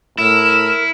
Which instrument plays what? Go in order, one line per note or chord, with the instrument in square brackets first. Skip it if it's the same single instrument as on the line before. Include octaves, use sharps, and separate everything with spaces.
[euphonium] A2 [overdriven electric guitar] E4 [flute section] A#4 E6 F6 [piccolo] E7